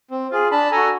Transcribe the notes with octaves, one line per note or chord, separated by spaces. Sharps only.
C4
F4 G#4
D4 A5 B5
F#4 A4 G#5 A#5